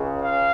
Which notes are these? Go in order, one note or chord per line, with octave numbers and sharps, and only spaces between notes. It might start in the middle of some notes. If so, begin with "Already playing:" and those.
Already playing: C#2 C#3 G#3
F5